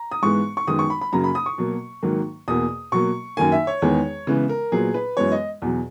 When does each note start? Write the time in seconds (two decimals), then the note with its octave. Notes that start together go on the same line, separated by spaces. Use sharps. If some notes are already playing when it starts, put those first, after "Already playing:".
Already playing: A#5
0.12 D#6
0.23 G#2 E3 G#3 B3 C#6
0.57 C#6
0.67 F#2 D#3 G#3 B3 D#6
0.79 C#6
0.90 B5
1.01 B5
1.13 F#2 C#3 F#3 A#3 A#5
1.24 B5
1.35 D#6
1.46 C#6
1.58 B2 F#3 A#3
2.03 G#2 D#3 F#3 A#3
2.48 E2 B2 A#3 D#6
2.92 B2 F#3 A#3 C#6
3.37 F#2 D#3 A#3 G#5
3.52 E5
3.67 C#5
3.82 E2 D#3 G#3 B3
4.27 C#3 E3 G#3 B3
4.49 A#4
4.72 A#2 F#3 B3 G#4
4.94 B4
5.17 F#2 E3 G#3 B3 C#5
5.32 D#5
5.62 E2 B2 F#3